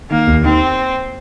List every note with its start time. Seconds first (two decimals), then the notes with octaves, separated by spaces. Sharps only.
0.10 D#3 A#3
0.27 D#2
0.44 D#3 C4